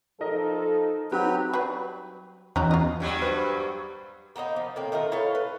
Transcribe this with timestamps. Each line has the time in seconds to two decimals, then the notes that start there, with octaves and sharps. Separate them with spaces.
0.21 F3 D#4 A4 A#4 D#5
1.12 F#3 C4 D#4 G4 B4
1.53 F#3 G3 B4
2.56 E2 C#4 D#4 F#4
2.71 F4 D#5
3.00 G2 F#3 G3
3.22 B4 C5
4.36 A#3 B3 D4 D#4
4.56 F3
4.76 A2 A#3 C4
4.92 D#3 A3 F4 A#4
5.12 E4 A4 C#5 F5
5.35 B4